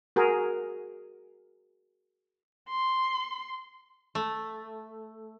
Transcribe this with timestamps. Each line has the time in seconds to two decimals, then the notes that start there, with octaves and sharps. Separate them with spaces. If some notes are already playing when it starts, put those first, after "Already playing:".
0.16 F#4 G#4 A#4
2.70 C6
4.15 A3